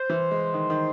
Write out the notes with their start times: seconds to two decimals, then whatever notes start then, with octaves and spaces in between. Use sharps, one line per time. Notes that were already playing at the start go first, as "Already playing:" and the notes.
Already playing: C5
0.09 E3
0.31 G#3
0.54 D#3
0.70 D#3